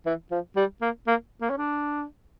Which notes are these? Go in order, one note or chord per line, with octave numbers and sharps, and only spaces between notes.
E3
F3
G3
A#3
A#3
A#3
C#4
D4